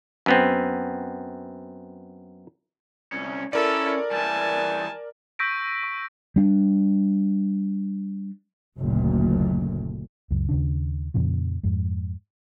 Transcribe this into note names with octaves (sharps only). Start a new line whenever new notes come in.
F#2 B3 C4
C2 C#4
C#4 E4 A4 A#4 D5
E3 G3 G#5 A5
C#6 E6 G6 A#6 B6 D7
C#6
G3 D4
F#1 D2 A#2
C#2 F#2
D#2 C#3 D4
F2 A#2 C#3 F3
F2 G#2